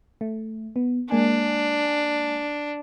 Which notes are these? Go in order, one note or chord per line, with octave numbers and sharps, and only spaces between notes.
A3
B3
G#3 A#3 D4 G#5